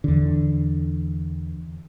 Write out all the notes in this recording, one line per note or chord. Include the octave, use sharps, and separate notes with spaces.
E2 D3